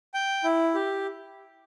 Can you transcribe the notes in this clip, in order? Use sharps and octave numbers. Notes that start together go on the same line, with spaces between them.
G5
E4
G4